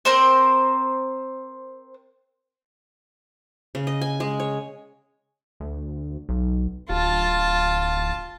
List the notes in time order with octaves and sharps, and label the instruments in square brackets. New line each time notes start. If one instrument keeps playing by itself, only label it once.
[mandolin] C4 A#4 C5
[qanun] C#3
D#5
G#5
G#3
C#5
[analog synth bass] D2
B1
[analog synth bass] D1 [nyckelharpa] F4 A5